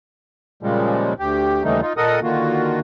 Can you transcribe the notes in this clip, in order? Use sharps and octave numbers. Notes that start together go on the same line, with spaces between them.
A#2 C#3 F3 G3 G#3
D2 G4
D#2 C#3 E3 G3 A3 D#4
D#4 F4
A#2 A4 A#4 D#5 F#5 D#6
D3 D#3 A#3 F4 F#4